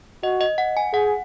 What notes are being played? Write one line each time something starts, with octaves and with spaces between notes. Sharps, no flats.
F#4 D#5
D#5
F#5
G#5
G#4 F#5